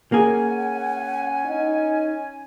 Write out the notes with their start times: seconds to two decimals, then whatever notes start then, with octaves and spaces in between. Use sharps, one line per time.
0.12 A#3 C#4 G#4 F#5 G#5
1.46 D#4